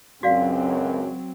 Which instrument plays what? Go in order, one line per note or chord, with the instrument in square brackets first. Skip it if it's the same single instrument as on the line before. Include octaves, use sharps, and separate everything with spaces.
[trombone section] C#2 F#2 [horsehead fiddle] F#3 C4 [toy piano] F#4 D5 F5